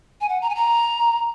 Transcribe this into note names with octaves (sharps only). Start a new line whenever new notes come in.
G#5
F#5
A#5
G#5
A#5